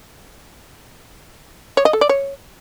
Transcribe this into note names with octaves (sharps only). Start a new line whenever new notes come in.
C#5
D#5
A4
D5
C#5